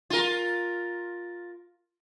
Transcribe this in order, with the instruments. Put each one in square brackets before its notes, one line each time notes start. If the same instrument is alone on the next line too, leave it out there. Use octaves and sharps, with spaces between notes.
[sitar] F4 A#4